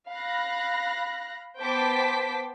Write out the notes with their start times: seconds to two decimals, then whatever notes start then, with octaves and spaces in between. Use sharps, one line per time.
0.10 F5 B5 F#6 A#6
1.61 B3 C5 G5 A5 D6 B6